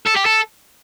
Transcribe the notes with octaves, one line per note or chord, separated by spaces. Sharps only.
A4
G4
A4